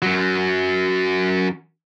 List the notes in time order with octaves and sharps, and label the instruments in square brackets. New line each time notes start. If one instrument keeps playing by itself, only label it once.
[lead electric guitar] F#2 F#3